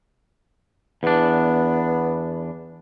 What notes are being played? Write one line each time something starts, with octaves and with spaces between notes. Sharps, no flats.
E2 B3 D4